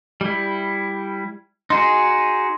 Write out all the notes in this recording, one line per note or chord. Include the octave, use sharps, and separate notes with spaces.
G3 E4
D#4 F#4 G#4 C6